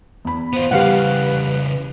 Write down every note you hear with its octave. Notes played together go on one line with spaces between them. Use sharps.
E2 B5
B3 F4 C5
C#3 E3 G3 G4 B4 F5 F#5